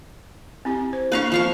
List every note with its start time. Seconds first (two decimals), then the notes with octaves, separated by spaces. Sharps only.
0.65 C4 E4 G4
0.93 C5
1.12 A#3 D4 E4 B4 F5 C#6
1.32 F3 F5 C#6